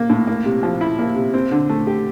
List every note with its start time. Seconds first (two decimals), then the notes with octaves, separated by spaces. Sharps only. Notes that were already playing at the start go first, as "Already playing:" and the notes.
Already playing: A#3
0.10 A2
0.27 A#3
0.45 C3
0.63 F3
0.81 E4
0.99 A#3
1.16 C3
1.34 C4
1.51 D3
1.69 A3
1.87 G4